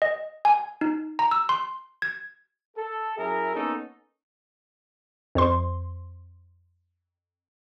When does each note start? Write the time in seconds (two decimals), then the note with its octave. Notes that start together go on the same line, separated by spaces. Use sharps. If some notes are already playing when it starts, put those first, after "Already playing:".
0.02 D#5
0.45 G#5
0.81 D#4
1.19 A#5
1.31 E6
1.49 C6
2.02 G#6
2.76 A4
3.17 F#2 E4 G#4 A#4 E5
3.53 A#3 B3 C#4 D#4 A4
5.35 F2 C5 C6